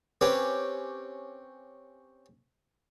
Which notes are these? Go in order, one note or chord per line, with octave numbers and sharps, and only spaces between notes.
C4 C#4 G4 B4